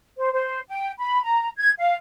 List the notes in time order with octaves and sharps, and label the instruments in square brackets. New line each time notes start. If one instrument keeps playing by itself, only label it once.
[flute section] C5
C5
G5
B5
A#5
G#6
F5